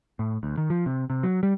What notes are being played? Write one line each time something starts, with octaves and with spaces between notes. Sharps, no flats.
A2
D2
D#3
F3
C3
C3
F#3
G3